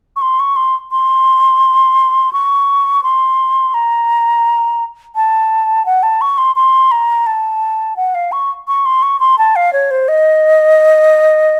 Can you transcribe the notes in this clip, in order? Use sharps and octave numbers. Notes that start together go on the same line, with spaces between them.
C#6
C6
C#6
C6
C6
C#6
C6
A#5
A5
F#5
A5
C#6
C6
C6
A#5
A5
F#5
F5
C#6
C#6
C6
C#6
C6
A5
F5
C#5
C5
D#5